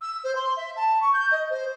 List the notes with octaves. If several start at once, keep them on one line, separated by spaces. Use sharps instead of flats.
E6
C5
C6
E5
A5
C#6
G6
D#5
C5